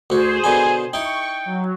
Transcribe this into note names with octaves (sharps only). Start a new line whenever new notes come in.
D2 F#4 G#4 C5
B2 D3 G#5 B5
D#4 E4 G5 C#6
F#3